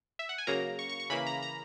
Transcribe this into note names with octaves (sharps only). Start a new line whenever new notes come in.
E5
F#5
G#5
C#3 F#3 A#3 A#5
C#6
C#6
C#6
C#3 E3 A#3 B5
A#5
A#5